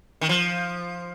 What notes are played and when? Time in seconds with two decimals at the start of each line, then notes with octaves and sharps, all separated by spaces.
0.21 D#3
0.29 F3